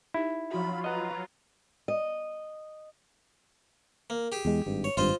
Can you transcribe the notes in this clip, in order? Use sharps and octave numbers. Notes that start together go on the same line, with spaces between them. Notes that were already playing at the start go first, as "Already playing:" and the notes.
D#4 E4 G4
F3 F#3 F4 F#4 B5
B4 D#5 F#5 A#5
D#5
A#3
G4 G#4
E2 G#3
G#1 G2
C#5
G#1 G2 F4 C5 D#5